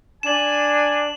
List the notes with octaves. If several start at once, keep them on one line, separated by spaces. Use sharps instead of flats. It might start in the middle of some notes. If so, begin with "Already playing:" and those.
D4 G#5 E7 F#7